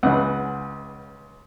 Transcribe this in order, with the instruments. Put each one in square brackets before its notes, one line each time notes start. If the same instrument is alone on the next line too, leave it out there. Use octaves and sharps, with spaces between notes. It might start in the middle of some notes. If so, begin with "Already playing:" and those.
[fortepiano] C#2 C#3 E3 F#5